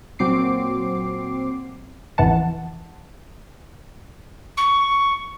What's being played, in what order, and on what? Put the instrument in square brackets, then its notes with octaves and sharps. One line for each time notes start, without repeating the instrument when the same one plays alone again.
[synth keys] A#2 F#3 C4 D6 C7
[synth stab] G#1 F2 E3 F#5 A5
[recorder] C#6